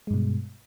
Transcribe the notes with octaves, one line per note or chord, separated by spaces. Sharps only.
G2 B2 G#3